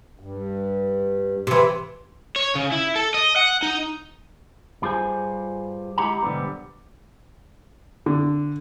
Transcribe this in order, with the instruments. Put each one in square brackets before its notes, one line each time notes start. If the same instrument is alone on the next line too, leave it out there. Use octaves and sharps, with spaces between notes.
[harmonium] G2
[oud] C3 E3
[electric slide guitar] C#5
C#3
E4
A4
D#5
F#5
D#4
[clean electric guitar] G2 G3 F4 G#4 C5 G#5
G#3 E4 G4 F#5 A#5
B1 G#2 D3 G3 B3
[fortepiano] D3